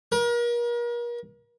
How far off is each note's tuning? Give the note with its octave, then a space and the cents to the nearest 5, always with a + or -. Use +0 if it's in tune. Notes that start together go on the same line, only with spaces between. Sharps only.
A#4 +40